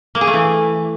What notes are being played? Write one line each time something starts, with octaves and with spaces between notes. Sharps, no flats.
A#3
G#4
A3
E3